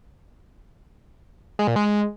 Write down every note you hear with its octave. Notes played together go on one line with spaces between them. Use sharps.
G#3
A#2
G#3